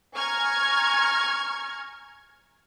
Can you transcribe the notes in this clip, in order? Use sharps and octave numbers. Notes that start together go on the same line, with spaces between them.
G#5 A#5 C#6 F6 G#6